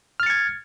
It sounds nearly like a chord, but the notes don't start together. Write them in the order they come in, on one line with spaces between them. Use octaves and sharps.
F6 A6 C#7 G#6